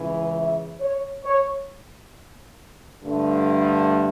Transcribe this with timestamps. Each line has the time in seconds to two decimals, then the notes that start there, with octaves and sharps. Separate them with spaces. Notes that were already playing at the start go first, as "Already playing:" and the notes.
Already playing: C#2 C#3 E3
0.36 E5
0.80 C#5
1.25 C#5
3.02 G2 D3 A3